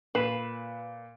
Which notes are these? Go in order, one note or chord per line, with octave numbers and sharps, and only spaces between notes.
A#2 B4 C7 E7